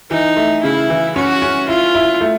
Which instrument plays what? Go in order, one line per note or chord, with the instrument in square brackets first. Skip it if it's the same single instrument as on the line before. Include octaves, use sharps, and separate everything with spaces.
[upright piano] E3 [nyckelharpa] D#4
[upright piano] A3
[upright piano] C#3 [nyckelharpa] E4
[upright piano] E3
[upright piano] C#4 [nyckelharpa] F#4
[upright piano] C#4
[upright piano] E4 [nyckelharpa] F4
[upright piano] E4
A3